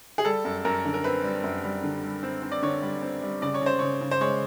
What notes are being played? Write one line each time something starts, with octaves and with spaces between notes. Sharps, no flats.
G#4
G3 A4
F#2
F#2 A#4
D3
A#4
C4 B4
G3
F#2
G3
D3
G3
C4
C4
D5
D3 C#5
G3
C4
G3
C#3 D5
C#5
C#3 C5
C#3 C#5
C#3
C5
G#3 C#5